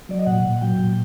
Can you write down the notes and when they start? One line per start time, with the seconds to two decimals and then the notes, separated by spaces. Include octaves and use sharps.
0.09 F#3 D5
0.19 D#5
0.26 A#2 F#5
0.44 A#2
0.61 F#3 G5
0.79 A#2